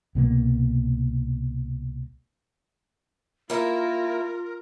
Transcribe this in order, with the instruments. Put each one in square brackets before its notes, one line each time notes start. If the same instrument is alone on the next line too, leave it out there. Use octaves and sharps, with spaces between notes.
[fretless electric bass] C2 B2 E3 A#3
[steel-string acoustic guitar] A#3 E4 [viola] F4 [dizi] A#4